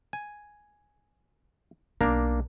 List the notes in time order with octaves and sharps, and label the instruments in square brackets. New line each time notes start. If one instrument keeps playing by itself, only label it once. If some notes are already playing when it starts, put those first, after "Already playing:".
[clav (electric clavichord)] G#5
[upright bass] B1 B2 [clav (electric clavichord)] A#3 D4 A#5